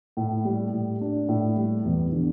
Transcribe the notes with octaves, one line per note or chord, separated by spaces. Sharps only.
A2
G3
A2
D4
A2
G3
E2
D3